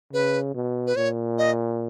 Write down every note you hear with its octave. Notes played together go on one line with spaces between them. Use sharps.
C#3 B4
B2
B4
A#2 C#5
D#5